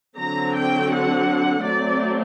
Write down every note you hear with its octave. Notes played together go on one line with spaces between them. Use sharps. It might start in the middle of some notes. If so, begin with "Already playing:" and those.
D3 F#3 C4 A#5
G5
F#5
F#3 A3 C4 D5